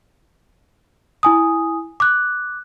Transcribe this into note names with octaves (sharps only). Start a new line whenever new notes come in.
E4 G#5 D#6
D6 F#6